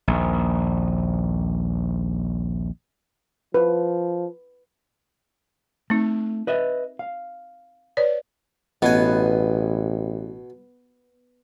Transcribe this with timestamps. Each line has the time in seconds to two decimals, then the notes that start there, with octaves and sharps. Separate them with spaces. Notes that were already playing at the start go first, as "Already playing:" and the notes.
0.08 A#1 D#2
3.54 F3 B4
5.90 A3 C4 D#4
6.47 B4 D#5 E5
6.99 F5
7.97 B4 C#5 D5
8.82 A1 B2 B3 G#5